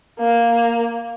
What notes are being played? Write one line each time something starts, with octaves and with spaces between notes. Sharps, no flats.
A#3